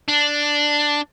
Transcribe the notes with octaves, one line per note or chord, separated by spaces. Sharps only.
D4